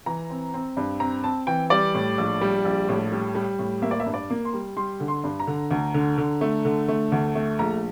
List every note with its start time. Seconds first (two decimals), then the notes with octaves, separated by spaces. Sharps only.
0.06 E3 A#5
0.30 C4
0.54 C4
0.77 G2
1.00 C4 A#5
1.23 C4 A5
1.47 E3 G5
1.70 G3 D5
1.94 A2
2.18 A#1
2.41 G3
2.65 A#1
2.89 A2
3.12 G3
3.35 G3
3.59 A2
3.82 A#3 E5
3.91 D5
4.00 E5
4.06 G2
4.14 D5
4.30 A#3
4.45 C6
4.53 G3
4.77 G3 C6
5.00 D3
5.08 C6
5.24 G2
5.40 A#5
5.47 D3
5.71 D2
5.94 D3
6.18 D3
6.41 A3
6.65 D3
6.88 A3
7.12 D2
7.35 A3
7.59 A#1 A#5